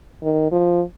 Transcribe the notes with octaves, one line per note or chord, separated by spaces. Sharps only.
D#3
F3